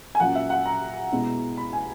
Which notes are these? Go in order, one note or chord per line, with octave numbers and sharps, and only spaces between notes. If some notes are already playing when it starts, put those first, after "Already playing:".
G#5
A#2 F#3 A#3 C#4 F#5
E5
F#5
A#5
B2 G#3 B3 E4
B5
G#5